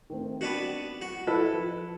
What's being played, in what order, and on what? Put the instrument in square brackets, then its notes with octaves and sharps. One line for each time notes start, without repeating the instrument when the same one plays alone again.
[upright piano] D#3 A3 C4
[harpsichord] B3 D4 F#4
[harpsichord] F#4 [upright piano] F#5
[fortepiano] E4 A4 B4
[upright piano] F3